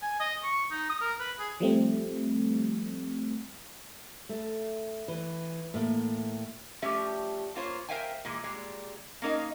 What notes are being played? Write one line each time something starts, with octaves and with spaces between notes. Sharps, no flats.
G#5
D#5
C#6
D#4
D#6
A#4
B4
G#4
F3 G3 A3 C4
A3
E3
A2 A#3
F3 G3 A3 C#4 G4 E5
A#3 F4 C5 C#5
A#4 C5 E5 F5 G5 G#5
A#2 E3 G#3
A#2 G3 G#3
A#3 C#4 D#4 A#4 D#5 F5